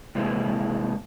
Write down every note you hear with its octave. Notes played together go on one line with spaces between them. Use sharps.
A2 C3 E3 G#3 A#3 E4